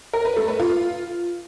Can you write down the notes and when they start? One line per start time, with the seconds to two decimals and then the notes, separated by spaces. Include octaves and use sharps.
0.13 A#4
0.25 B4
0.37 A3
0.48 B4
0.60 F4